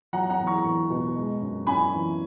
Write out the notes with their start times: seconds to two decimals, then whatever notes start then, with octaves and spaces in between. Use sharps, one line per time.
0.13 F#3 F#5 A#5
0.29 F#5 A#5
0.39 E2
0.47 A#5 C#6
0.64 E2
0.90 B2
1.16 G#3
1.41 F#2
1.67 F#2 G#5 B5
1.92 E3